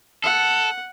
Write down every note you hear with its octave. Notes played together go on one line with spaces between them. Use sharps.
A4 F#5